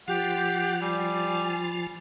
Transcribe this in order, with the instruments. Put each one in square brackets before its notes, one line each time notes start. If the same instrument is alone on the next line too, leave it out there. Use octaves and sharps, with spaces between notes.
[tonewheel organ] F3 F4 [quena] G4 [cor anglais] F#5
[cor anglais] G3 [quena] G#5